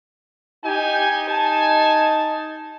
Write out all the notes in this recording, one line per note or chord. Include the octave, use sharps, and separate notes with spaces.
D#4 G4 G#5
G#5 A5